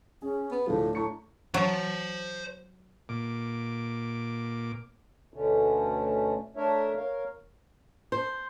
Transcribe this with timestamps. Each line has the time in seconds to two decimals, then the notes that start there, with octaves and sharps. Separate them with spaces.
0.22 C#4 G#4
0.51 B3
0.67 D2 A2 F3 D4
0.95 A2 A#5 C#6 C#7
1.54 F#3 C5 A5
3.09 A#2 D6
5.34 D2 B2 D3 A3 C#4
6.57 A3 D4 A#4 C#5 E5
6.96 A#4 C#5 F5
8.12 C5